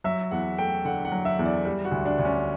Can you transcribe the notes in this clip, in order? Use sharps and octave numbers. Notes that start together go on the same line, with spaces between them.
F#3 E5
E2 F#5
A3 G5
D3 F#5
F#5
F#3
E5
E2
D5
G3
F#4
D2
D4
D2 D4
C#4